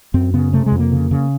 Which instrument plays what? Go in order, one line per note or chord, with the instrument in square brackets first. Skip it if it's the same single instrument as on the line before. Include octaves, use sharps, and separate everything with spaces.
[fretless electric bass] F#2 C4
C#3 B3
C3 A3
G#3
F2
A#3
C#3
C#3